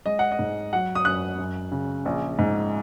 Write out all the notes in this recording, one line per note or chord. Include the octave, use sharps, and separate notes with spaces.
G#3 D#5
F#5
D#5
G#2
F#3 F#5
D#6
F#2 F#6
F#2
C#3
A#1
G#2